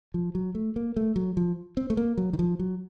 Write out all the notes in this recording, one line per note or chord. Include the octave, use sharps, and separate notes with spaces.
F3
F#3
A3
A#3
A3
F#3
F3
C4
A3
A#3
F#3
D#3
F3
F#3